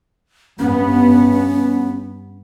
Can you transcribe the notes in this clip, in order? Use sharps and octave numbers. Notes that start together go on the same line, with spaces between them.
G2 B3 C#4